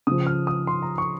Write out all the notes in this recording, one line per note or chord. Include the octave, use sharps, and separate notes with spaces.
C#3 F3 D#6
F6
D#6
C6
A#5
C#6